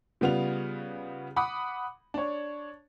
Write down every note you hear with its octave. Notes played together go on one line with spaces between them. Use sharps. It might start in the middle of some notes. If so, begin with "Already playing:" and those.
C#3 G3 B3 F4 F7
F#5 B5 D6 D#6
D4 C#5